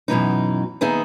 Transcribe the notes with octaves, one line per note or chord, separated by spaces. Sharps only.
F#2 B2 E3 D#4
D#2 B3 D#4 G#4 E5